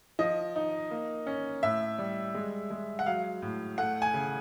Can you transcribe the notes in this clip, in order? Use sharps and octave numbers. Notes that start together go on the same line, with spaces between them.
F3 D#5
D#4
A#3
C#4
A2 E5
G3
G#3
G#3
F#5
F#3 F5
A2
A3 F#5
G#5
C#3